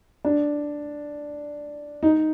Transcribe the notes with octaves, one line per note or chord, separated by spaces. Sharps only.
D4
D#4